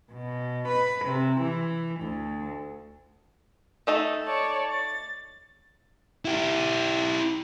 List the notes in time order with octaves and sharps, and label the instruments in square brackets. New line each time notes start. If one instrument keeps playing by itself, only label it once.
[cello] B2
B4
C3
E3
D2
[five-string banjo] A3 D#4 A4
[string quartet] C#5 D5 A5
A6
[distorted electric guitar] E4 G4